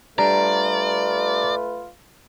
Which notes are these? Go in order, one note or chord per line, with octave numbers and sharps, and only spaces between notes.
G3 A3 D4 F4 B4 D5 A#5